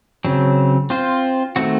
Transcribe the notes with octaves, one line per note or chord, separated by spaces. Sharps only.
C#3 F#3 C4
C4 F4 C5
D#3 A3 C4 F#4